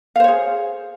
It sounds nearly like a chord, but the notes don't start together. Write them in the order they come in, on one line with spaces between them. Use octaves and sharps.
F5 C5 C#5 G#4